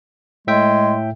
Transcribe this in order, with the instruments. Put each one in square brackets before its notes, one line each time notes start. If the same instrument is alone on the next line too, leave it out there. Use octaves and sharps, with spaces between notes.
[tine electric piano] A2 E5 G5 [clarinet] G#3